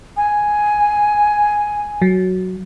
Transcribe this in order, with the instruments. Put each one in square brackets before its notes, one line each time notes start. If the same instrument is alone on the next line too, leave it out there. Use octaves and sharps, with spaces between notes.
[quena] G#5
[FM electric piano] F#3